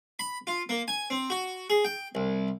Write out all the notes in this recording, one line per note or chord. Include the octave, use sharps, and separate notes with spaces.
B5
F4
A#3
G#5
C4
F#4
G#4
G5
C2